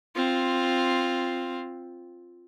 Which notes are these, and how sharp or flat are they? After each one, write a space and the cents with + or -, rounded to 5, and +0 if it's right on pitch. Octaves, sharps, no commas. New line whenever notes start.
C4 +5 F4 +0